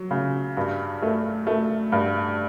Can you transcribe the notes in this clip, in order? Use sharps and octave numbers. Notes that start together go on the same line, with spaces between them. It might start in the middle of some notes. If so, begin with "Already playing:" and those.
Already playing: F#3
C#3
G2
A3
A3
G2